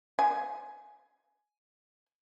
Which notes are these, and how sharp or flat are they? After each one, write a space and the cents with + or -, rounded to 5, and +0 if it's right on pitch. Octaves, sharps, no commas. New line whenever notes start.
G#5 +15